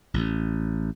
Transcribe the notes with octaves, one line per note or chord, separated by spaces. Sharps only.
A1